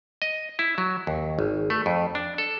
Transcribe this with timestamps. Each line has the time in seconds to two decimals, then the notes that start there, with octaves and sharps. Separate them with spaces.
0.22 D#5
0.59 E4
0.78 F#3
1.07 D#2
1.39 G#1
1.70 A3
1.86 F2
2.15 D4
2.38 A4